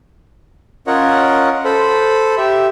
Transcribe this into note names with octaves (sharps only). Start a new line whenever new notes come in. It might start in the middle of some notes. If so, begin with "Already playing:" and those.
C#4 F4 A#4 C#5 D#5 F#5
A4 C5 B5
G4 E5